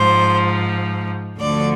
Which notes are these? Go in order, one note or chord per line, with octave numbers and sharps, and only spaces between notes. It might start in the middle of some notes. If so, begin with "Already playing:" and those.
Already playing: G#2 F3 C5
D2 D3 F3 D5